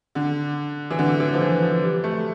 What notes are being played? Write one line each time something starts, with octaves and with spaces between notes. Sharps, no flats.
D3
E3
D3
E3
F3
E3
F3
G3
A3